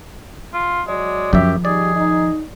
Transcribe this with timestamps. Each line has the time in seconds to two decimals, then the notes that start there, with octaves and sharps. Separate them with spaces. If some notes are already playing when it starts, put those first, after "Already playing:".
0.53 F4
0.87 F#3 G#3 D5
1.33 F#2 D#3 F3 G4 E5
1.65 G3 D#4 G#4 D5
1.95 D#4